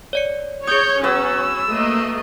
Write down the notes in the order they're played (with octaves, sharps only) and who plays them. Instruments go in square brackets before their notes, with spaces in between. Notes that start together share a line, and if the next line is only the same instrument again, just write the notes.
[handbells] C#5 D5 C#7
[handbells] G#4 D#6 [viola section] C#5 [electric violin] G6
[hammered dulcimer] F#3 B3 [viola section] C#4 [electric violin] E6
[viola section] A3 A#3 D#5